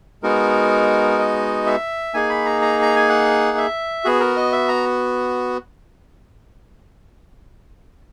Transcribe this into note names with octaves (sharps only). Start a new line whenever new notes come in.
G#3 B3 D#4 F#4 A#4
D#5
E5
A#3 D#4 G#4 G#5
B5
A#5
A#5
A#5
G#5
F#5
E5
B3 F#4 G#4
A#4
D#5
E5
A#5